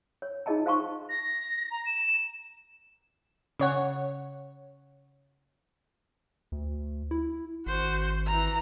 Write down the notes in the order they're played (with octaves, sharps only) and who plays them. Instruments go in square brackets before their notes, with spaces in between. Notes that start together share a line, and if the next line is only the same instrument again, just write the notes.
[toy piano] C#5
D#4 F4 G#4 D#5 A5 A#5
C5 F5 A5 C6 C#6
[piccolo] A#6
A#5
E7
[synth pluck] C#3 C#5 F#5
[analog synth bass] D2
E4
[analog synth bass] G#1 [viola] F#4 C5
[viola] E3 A#5